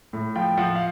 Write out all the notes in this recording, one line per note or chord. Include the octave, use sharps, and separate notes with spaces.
A2
F3 G5
F3 F#5
F5